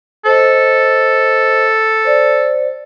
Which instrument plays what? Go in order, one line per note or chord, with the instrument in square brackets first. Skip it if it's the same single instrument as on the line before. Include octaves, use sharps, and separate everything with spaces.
[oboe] A4 [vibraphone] C5 D#5
[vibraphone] C5 D5